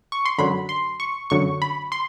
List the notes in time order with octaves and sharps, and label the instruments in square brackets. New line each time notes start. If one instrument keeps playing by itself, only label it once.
[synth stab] C#6
C6
F#2 D3 F#3 B5
C6
C#6
F#2 D3 F#3 C#6
B5
C6